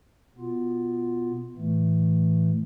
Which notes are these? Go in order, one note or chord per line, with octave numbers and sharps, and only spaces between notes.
B2 B3 F4
A2 E3 A3